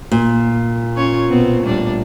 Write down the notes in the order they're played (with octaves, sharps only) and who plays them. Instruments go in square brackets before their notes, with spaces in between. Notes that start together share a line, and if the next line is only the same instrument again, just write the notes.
[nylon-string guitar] A#2
[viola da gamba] C#4 F4 C#5
B2 B3 C4
A2 G3 D4